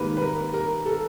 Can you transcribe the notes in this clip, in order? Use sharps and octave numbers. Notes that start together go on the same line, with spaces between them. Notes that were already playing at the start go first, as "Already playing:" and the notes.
Already playing: G#2 D#3 G3 A#3 B4
B4
A#4
A#4
A4